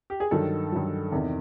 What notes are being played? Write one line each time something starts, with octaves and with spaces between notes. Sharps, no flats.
G4
G#4
G2 D#3 F#3 A4
G2 D#3 F#3
E2 C3 D#3